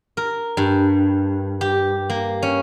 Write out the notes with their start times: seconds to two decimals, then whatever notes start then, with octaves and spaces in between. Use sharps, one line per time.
0.17 A#4
0.57 G2
1.61 G4
2.10 A#3
2.43 C#4